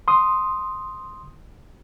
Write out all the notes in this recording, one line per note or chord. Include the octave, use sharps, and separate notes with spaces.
C6 D#6